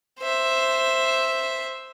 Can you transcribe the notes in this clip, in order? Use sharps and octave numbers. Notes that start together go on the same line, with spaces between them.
C5 E5